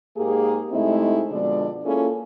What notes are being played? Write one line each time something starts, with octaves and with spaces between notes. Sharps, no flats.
G#2 A#3 G4 G#4
C3 G#3 A3 C4 D#4 E4
B2 D3 F3 G#3 D4 D5
A#3 C#4 E4 F4 G#4 A4